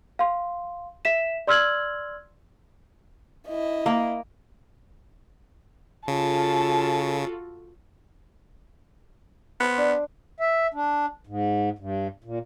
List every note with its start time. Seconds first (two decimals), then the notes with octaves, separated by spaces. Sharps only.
0.19 F5 C6
1.05 E5 B6 E7
1.47 D5 C6 E6 F6 G#6 F#7
3.48 E4 D#5
3.86 A#3
6.08 C#3 F4 F#4 A4 A5
9.60 B3 C5
9.78 D4
10.40 E5
10.74 D4
11.27 G#2
11.79 G2
12.24 A#2